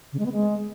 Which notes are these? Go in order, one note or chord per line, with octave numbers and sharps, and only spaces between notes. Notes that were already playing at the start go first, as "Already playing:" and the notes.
C#3
G#3
B3
G#3